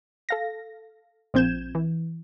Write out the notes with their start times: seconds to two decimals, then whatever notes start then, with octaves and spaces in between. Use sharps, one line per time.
0.29 A4 F5 A#6
1.34 A#1 F3 C4 G6 G#6 E7
1.75 E3